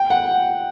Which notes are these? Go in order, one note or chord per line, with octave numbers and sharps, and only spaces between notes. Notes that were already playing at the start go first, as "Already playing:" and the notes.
Already playing: G5
F#5